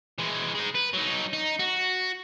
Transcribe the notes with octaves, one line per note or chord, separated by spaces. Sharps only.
E3 G#3
G#3 D#4
B4
F#3 D#4
D#4
F#4